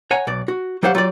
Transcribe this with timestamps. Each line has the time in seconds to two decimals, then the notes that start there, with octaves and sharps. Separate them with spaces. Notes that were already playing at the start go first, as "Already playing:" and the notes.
0.11 C#5 F#5 G#5 A#5
0.27 B1 D5
0.48 F#4
0.83 F#3 G4 C5 F5 F#5
0.95 F#3 F4 G4 D5